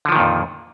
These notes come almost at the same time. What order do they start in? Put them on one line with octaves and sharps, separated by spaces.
D3 F3 D#3 A#2 F2